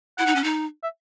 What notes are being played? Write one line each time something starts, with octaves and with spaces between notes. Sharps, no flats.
E4 F#5
D#4
C#4
D#4
E5